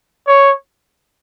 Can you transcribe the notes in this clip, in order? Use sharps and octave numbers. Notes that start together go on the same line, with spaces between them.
C#5